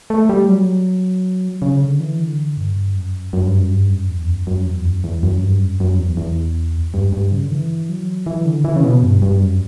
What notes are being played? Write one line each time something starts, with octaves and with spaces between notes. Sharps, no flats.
A3
G3
F#3
C#3
D3
E3
D3
G2
F#2
F#2
G2
F#2
G2
F#2
E2
F#2
F#2
E2
F#2
E2
F#2
G2
F#2
F#2
E2
E2
G2
G2
C#3
D3
E3
F#3
E3
D3
E3
C#3
B2
G2
G2
F#2